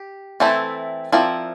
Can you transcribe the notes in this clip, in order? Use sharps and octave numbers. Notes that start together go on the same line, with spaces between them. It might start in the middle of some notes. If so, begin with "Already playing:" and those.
Already playing: G4
E3 A3 C4 E4 A4
F3 C4 E4 A#4 D5